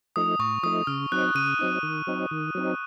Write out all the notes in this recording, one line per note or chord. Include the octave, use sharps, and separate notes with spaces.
F3 A3 D#4 D#6
A2 C#6
F3 A3 D#4 D#6
C#3 F6
F#3 C4 D#4 F#6
C#3 D#7
F#3 C4 D#4
D#3
F#3 C4 D#4
D#3
F#3 C4 D#4